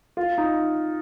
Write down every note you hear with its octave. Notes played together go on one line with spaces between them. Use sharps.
F4
D#4